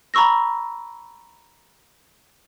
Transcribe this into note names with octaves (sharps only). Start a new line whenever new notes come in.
A#5 B5 C#6 E6 A#6